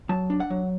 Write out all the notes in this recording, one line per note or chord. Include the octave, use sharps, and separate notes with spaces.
F#3 A5
D4
F#5
F#3